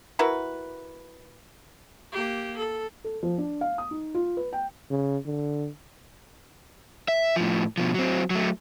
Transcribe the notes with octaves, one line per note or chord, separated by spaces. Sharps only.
E4 F#4 A#4 B4
A#3 G4
A4
A4
F3
D4
F5
D#6
D#4
F4
B4
G5
C#3
D3
E5
A2 F3
B2 F3
F#3 C4
F#3 A3